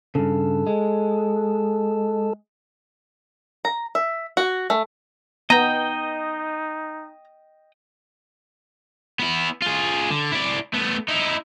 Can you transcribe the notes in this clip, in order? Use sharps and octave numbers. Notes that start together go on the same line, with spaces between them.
G2 C#3 A4
G#3
A#5
E5
F#4
A3
B3 D#4 D#5 G5 A#5
B3 E4
F4 G#4
D3
E4 D5
A3 B3
D#4 E4